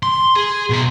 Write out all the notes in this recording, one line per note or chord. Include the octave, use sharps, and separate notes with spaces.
C6
G#4
B2 C6